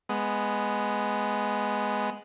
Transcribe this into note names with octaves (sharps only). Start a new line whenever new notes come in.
G#3 B3